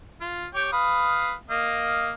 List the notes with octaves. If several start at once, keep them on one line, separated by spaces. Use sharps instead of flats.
F4
G4 C#5 G5
B4 F5 D#6
A#3 D#5 F5